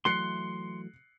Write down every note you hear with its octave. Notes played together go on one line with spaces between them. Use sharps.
E3 F#3 A3 C6 F#6 C7 C#7